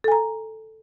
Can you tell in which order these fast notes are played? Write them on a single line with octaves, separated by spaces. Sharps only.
A4 G#5 A#5